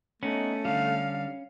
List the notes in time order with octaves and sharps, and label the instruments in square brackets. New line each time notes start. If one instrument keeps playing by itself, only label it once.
[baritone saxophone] A3 [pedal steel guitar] B3 D#4 [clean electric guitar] C#4
[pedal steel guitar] D3 G3 [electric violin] F5